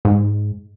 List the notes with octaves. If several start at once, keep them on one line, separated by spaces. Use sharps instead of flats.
G#2